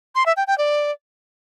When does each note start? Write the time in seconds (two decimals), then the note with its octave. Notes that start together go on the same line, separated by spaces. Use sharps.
0.15 C6
0.26 E5
0.37 G5
0.47 G5
0.58 D5